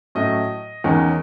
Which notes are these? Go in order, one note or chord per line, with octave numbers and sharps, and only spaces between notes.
A2 F#3 A3 C#4 D#5
E2 D#3 G#3 C#4